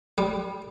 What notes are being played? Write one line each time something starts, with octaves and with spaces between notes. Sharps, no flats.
G3